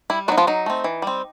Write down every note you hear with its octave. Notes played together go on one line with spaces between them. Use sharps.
G3 E4
F#3 B3 D#4 F#4
F3 F4
F#3 D#4
A3 C4
E3
G3 C4